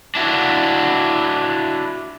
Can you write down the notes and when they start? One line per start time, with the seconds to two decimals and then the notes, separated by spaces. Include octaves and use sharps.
0.15 D4 E4 F#4